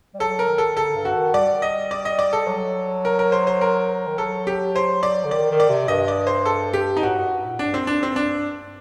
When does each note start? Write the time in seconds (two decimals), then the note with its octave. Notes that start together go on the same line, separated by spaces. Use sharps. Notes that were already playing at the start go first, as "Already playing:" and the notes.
0.15 G3
0.20 F#3 A4
0.39 A#4
0.48 D#3
0.58 A4
0.77 D3 A4
0.95 G2
1.05 F#4
1.15 D#3
1.34 G3 D5
1.62 D#5
1.91 D5
2.05 D#5
2.19 D5
2.33 A4
2.47 F#3
3.05 A#4
3.19 A#4
3.32 C5
3.47 C5
3.61 A#4
4.07 D#3
4.18 F#3 A4
4.47 G4
4.76 C5
5.03 D5
5.25 D3
5.31 D#3 D5
5.51 D#3
5.60 D5
5.69 C3
5.88 G2 D#5
6.08 D5
6.27 C5
6.45 A4
6.73 G4
6.97 D#4
7.02 A2 F#4
7.17 F#2
7.31 G2
7.45 A#2
7.59 A2 D4
7.68 G2
7.74 F#2 C4
7.85 G2 D4
8.03 C4
8.16 D4